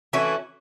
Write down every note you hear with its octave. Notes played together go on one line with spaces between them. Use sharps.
E3 A3 C#4 F#4